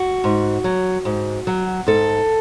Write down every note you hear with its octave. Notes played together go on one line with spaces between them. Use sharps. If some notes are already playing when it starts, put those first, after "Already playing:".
Already playing: F#4
G#2
F#3
G#2
F#3
G#2 A4